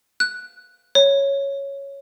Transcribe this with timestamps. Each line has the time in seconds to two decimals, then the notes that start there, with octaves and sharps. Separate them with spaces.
0.20 F#6
0.95 C#5